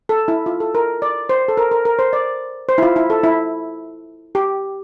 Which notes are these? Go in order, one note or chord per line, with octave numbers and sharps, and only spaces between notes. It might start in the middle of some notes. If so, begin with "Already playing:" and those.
A4
E4
F4
A4
A#4
D5
C5
A4
A#4
A#4
A#4
C5
D5
C5
E4
F4
E4
A4
E4
G4